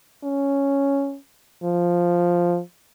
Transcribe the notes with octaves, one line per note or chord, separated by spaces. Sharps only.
C#4
F3